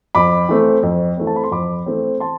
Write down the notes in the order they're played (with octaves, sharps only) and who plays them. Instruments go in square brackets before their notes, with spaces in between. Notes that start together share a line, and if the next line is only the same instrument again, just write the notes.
[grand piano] F2 B5 D6
E3 A3 C4
F2
E3 A3 C4
A5
B5
C6
F2 B5 D6
E3 A3 C4
A5 C6